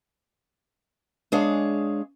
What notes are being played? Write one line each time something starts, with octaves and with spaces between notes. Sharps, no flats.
G#3 D4 G#4 C#5 F5